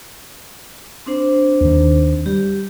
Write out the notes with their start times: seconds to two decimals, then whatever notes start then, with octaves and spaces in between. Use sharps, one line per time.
1.06 C4 D4 C5
1.61 D#2 D#3
2.26 G3 G4